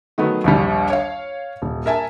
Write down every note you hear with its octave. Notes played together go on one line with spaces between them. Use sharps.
D#3 F#3 A3 B3
A#1 D#2 G3
C#5 F5
D#1
A#4 E5 G#5 A5